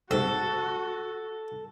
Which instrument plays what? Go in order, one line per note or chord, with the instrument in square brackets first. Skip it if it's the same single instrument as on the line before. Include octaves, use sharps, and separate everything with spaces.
[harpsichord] B1 G#2 C3 [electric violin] F#4 [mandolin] A4